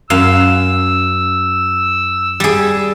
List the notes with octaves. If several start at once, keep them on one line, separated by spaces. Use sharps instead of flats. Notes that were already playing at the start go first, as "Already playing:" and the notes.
F#2 F5 E6
G3 G#4